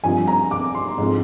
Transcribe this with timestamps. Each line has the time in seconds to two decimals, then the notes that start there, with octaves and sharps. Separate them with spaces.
0.04 G2 F3 C4 G#5
0.27 A#5
0.51 D6
0.75 C6
0.98 G#2 F3 C4